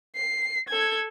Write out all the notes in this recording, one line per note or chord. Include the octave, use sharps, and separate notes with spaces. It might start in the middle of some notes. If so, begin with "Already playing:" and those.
C7
A4 G#6